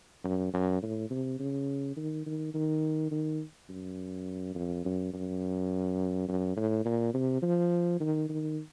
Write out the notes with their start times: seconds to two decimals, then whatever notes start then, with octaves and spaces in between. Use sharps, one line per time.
0.24 F#2
0.54 F#2
0.82 A2
1.10 C3
1.39 C#3
1.97 D#3
2.26 D#3
2.54 D#3
3.11 D#3
3.69 F#2
4.55 F2
4.85 F#2
5.14 F#2
6.28 F#2
6.56 A2
6.85 A#2
7.14 C3
7.42 F3
8.00 D#3
8.29 D#3